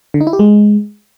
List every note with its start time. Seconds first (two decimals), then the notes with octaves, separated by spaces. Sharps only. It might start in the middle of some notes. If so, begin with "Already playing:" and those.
0.14 D3
0.21 D#4
0.27 E4
0.33 G4
0.39 G#3